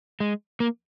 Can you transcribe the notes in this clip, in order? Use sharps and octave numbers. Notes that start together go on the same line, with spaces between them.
G#3
A#3